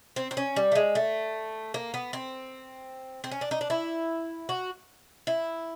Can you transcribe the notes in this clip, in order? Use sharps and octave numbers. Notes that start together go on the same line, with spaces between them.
C4
C4
C#4
G3
A3
G#3
A3
A#3
B3
C4
C4
C#4
D4
D#4
D4
E4
F#4
E4